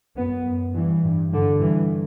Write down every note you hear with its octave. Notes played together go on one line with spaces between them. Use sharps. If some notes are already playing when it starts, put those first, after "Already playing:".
F#2 B3
F#2
G2 E3
G2
G2 D3
G2 E3